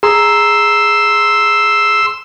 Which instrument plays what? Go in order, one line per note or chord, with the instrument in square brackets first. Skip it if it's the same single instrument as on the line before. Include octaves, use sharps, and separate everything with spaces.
[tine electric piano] G#4 A#5 [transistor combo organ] C6 E6